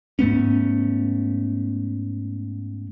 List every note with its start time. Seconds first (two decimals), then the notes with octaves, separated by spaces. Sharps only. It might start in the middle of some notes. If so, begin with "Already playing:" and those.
0.19 G#2 A3 B3 C#4